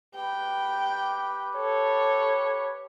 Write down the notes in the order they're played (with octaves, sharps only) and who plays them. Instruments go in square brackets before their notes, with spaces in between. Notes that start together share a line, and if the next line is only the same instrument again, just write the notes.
[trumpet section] G4 B4 [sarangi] G5
[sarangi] A4 [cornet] C#5